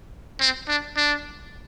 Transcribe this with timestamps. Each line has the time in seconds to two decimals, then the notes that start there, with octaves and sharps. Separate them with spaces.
0.40 C4
0.68 D4
0.97 D4